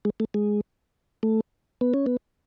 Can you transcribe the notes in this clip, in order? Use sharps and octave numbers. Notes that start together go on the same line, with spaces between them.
G#3
A3
G#3
A3
B3
C#4
B3